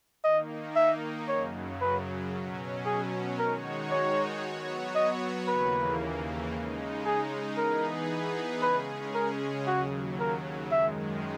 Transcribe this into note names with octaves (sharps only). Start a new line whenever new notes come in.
D#3 A#3 D#4 D#5
E5
F#2 C#3 F#3 C#5
B4
B2 F#3 C#4
G#4
D#3 G#3 D#4 F#4 A#4 C#5
C#5
F#3 B3 F#4 C#5
D#5
D#2 C#3 E3 A#3 B4
C#3 G#3 D#4
G#4
E3 B3 D#4 G#4 A#4 B4
C#3 G#3 C#4 G#4 B4
A#4
D#2 C#3 F#3 F#4
A#4
F#2 D#3 G#3 E5